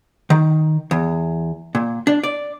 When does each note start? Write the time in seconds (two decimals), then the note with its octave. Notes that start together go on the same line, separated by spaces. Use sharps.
0.30 D#3
0.91 E2
1.75 A#2
2.07 D4
2.24 D5